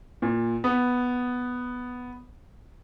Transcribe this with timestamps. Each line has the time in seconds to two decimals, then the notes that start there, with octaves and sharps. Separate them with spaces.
0.22 A#2
0.64 B3